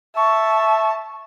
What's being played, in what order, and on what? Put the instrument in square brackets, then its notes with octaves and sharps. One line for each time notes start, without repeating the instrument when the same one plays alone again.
[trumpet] E5 [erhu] A5 [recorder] C#6